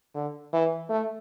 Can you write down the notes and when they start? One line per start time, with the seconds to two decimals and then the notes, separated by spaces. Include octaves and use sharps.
0.15 D3
0.53 E3
0.90 A3